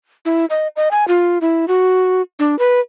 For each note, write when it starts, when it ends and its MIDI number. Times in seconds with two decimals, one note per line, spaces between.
0.25 0.45 64
0.50 0.68 75
0.76 0.89 75
0.91 1.07 80
1.08 1.38 65
1.41 1.68 64
1.68 2.22 66
2.39 2.58 62
2.59 2.80 71